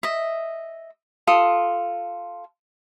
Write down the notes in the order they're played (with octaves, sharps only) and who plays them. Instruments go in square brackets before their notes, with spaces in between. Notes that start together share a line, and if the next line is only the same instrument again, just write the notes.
[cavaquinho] D#5 E5
F4 A4 D#6